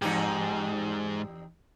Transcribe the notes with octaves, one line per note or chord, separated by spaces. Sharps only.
E2 G#2 D#4 G4